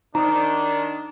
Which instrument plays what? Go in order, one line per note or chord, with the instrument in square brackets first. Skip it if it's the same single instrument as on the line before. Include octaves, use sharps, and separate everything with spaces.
[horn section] D#3 D4 [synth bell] D#4 D#6 [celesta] A#5